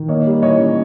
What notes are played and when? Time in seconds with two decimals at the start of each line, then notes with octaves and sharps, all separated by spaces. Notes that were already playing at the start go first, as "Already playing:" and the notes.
Already playing: D#3
0.08 A#3 C#5 D#5
0.26 G3
0.42 E3 C#5 D#5
0.59 C#4